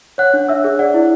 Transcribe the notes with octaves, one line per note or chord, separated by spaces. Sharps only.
C#5 F#5 F#6
D4
D4 E5 E6
G#4
D5 F#5
E4